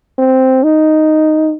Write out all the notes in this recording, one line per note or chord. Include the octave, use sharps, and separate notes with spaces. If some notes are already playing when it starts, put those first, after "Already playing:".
C4
D#4